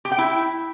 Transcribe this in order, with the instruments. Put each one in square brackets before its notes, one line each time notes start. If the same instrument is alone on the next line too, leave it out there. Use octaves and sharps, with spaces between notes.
[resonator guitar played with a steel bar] G4
G5
E4